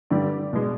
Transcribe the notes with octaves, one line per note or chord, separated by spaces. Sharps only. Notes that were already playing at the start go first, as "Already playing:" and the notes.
G2 D3 G3 D5
B2 G#3